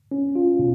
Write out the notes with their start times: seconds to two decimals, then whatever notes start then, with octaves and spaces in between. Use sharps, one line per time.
0.11 C#4
0.35 F4
0.59 B2